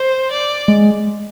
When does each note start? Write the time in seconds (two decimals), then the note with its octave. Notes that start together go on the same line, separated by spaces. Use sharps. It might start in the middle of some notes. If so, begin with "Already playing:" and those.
Already playing: C5
0.31 D5
0.68 G#3